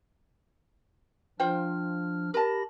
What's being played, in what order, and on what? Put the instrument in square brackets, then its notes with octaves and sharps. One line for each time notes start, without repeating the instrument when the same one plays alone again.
[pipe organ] F3 D4 F6 [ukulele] F4 C5 G5
[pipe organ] G4 B5 A#6 [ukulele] A#4 A5